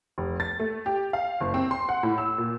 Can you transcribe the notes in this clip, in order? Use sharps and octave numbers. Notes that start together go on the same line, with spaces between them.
F1
A6
A3
G4
F5
F#1
C4
C6
F#5
A2
E6
A#2